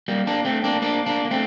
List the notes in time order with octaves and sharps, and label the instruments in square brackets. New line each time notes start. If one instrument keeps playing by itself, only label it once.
[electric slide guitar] G3 A#3
A#3 D4
A3 C4
A#3 D4
A#3 D4
A#3 D4
A#3
A3 C4